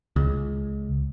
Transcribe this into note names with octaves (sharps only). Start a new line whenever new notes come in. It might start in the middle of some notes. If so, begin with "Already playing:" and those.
C#2